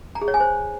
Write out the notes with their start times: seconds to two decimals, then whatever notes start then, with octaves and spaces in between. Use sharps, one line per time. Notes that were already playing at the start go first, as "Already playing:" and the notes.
0.15 A#5
0.22 G#4
0.28 C#5
0.34 G#5
0.40 C5